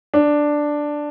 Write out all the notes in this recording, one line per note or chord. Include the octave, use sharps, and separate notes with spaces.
D4